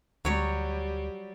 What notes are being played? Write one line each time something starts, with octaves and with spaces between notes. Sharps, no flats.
D2 F#3 G3 C#5